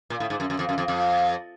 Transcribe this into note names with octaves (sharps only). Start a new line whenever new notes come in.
A#2
A2
G#2
F#2
F#2
F2
F#2
F2
F2